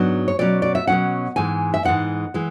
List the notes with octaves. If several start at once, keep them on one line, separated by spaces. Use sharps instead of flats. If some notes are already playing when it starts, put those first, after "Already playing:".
Already playing: G#2 F#3 B3 D4
C#5
B2 F#3 C#4 D5
D5
E5
B2 F#3 C#4 F#5
G#2 E3 G#3 G#5
E5
G#2 E3 G#3 F#5
E3 G#3